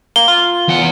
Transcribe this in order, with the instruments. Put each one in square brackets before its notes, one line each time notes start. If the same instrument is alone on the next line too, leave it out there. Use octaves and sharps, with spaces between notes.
[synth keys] A#3 [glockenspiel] G7
[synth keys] F4
[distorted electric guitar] E2 F#5